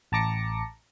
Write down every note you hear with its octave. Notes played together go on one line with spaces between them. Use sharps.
A1 A5 A#5 D6 A#6 C#7